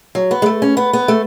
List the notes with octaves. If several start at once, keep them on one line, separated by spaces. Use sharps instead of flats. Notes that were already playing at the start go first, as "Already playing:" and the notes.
F#3
B3
G#3
A3
C#4
B3
B3
A3